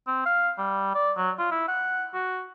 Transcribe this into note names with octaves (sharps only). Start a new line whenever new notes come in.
C4
F5
G3
D5
F#3
F4
E4
F#5
F#4